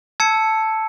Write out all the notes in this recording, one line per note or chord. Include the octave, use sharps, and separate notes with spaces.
A5 E6 G#6 C#7